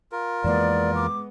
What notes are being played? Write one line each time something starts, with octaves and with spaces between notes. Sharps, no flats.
F4 A#4
F2 E3 G#3 A#3 B3 D5
D6